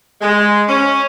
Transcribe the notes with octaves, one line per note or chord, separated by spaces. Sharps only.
G#3
C#4